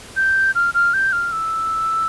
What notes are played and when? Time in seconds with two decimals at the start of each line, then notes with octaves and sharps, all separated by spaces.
0.16 G6
0.55 F6
0.74 F6
0.94 G6
1.13 F6
1.32 E6